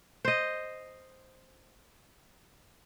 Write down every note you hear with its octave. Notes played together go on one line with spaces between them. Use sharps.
C5 D#5